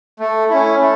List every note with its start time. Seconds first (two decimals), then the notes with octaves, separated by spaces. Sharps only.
0.20 A3
0.50 C#4 E4
0.81 A3